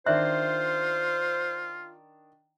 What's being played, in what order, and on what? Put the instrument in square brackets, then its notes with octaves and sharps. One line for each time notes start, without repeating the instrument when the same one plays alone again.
[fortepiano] D#3 D4 F#6 [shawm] F4 [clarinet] C5 [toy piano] E5